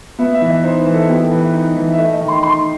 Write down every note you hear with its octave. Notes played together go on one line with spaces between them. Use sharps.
B3 E5
E5
E3
D#5
D#4 C5
B4
E3
A4
B3 G4
A4
E3
B4
D#4
E3
E5
A3 D#5
D#5
D#3
C6
D#4 C6